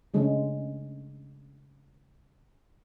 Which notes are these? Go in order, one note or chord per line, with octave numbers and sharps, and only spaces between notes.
C#3 G#3 A3 D4 C#5